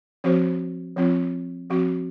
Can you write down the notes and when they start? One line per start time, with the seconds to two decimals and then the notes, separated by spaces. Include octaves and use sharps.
0.24 F3 C4 F#4 C5
0.97 F3 C4 F4
1.70 F3 C4 F#4